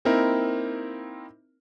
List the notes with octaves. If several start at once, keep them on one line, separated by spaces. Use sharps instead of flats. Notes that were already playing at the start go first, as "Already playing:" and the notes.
A#3 C4 D#4 E4 A#4